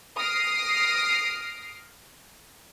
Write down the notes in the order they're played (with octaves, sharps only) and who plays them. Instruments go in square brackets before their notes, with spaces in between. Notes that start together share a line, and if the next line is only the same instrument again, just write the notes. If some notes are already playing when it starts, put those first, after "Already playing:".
[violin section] D#6 F6 A#6 C7 D7